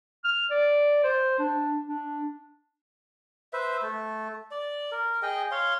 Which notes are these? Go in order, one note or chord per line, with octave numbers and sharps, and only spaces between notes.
F6
D5
C5
D4
D4
B4 C5 E5
A3
D5
A#4
G#4 D#5 G5
C#5 F5 C6